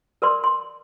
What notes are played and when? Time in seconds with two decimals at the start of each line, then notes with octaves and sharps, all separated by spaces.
0.22 A#4 B4 D5 C6
0.44 C6